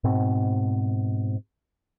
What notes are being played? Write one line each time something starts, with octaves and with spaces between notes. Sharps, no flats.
G#2 B2 C4